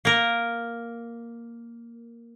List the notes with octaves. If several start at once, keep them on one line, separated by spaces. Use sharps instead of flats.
A#3 A#4